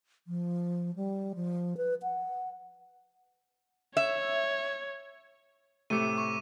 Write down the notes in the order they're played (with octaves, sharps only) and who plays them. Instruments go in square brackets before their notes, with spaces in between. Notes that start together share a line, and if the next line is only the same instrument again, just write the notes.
[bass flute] F3
G3
F3
B4
F#5
[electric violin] C#5 [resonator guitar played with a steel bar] E5
[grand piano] A2 C3 A3 [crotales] D6 D#7
[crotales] C#6